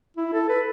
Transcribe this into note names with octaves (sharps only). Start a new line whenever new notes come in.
E4
A4
B4